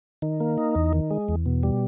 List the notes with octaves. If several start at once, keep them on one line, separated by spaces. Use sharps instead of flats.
D#3
A#3
D#4
E2
D#3
G#3
E2
B2
G3